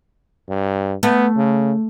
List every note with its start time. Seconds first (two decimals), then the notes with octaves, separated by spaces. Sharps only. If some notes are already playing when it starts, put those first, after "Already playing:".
0.48 G2
1.03 A3 B3
1.36 C#3